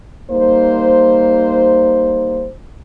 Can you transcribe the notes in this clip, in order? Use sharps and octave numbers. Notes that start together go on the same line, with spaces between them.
G3 A#3 D#4 C5